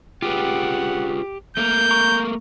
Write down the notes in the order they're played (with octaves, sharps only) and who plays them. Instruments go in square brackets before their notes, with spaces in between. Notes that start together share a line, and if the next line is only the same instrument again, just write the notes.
[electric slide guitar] F4 G#4 B4 [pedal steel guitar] G4 [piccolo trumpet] F#5
[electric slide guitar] A3 A#3 A#4 [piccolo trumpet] G6
[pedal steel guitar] A#5 C#6